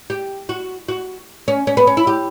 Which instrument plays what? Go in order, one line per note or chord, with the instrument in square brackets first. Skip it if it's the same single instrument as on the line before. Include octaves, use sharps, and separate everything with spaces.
[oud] G4
F#4
F#4
C#4
C#4
B3
C#4
E4
G4